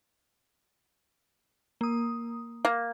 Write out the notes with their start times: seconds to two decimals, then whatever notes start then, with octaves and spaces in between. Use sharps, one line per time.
1.81 A#3 D#6
2.65 A#3